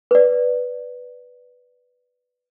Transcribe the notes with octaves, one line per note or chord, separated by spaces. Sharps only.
B4 D5